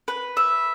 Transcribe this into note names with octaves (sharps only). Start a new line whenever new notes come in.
B4
E5